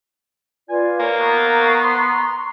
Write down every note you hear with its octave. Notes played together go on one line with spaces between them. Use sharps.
F4 B4 D5 G#5
A#3 C#5
B3 A#5 C#6
C6